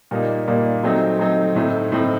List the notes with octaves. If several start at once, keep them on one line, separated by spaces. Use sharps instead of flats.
A#2 G3 A#3 D#4
A#2 G3 A#3 D#4
F#3 A3 C4 D#4
F#3 A3 C4 D#4
A2 A3 C4 D#4
A2 A3 C4 D#4